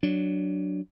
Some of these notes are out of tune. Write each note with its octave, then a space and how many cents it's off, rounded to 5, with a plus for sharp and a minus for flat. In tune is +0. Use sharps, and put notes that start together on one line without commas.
F#3 +5 D4 +0